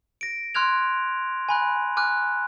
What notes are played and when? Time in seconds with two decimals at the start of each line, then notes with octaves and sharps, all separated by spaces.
0.21 A#6 D7
0.55 C6 F6 F#6 G#6 F7
1.49 G#5 B5 F#6
1.97 G#5 D6 F6 F#6